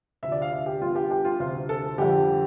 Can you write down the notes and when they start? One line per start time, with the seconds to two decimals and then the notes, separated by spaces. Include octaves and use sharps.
0.23 D2 C3 F3 E5
0.32 D5
0.42 F5
0.52 E5
0.66 G4
0.82 G2 F3 B3 F4
0.95 G4
1.11 G4
1.25 F4
1.40 D2 C3 F3 C4 F4
1.69 A4
1.98 F2 D3 G3 G4